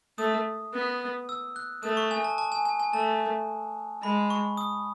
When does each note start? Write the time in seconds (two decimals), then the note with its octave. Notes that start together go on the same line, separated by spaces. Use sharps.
0.18 A3 D#6
0.73 B3
1.29 E6
1.56 F#6
1.83 A3 D#6
1.97 C#6
2.11 G#5
2.24 A5
2.38 A5
2.52 G#5
2.65 G#5
2.80 G#5
2.93 A3 A5
4.02 G#3 B5
4.30 C#6
4.57 D#6